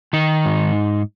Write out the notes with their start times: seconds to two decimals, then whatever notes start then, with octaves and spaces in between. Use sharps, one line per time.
0.13 D#3 D#4
0.45 G#2